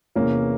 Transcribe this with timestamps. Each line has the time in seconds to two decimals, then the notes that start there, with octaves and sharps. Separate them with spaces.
0.16 E2 C3 E3 A#3 C#4